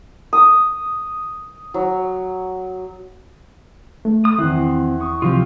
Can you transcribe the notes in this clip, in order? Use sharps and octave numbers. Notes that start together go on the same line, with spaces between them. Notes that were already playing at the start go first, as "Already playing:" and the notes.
D#6
F#3
A3
D#6
E2 D#3 C4 E4 F#6
C#6 D#6
C#2 C3 E3 F3 C4 F4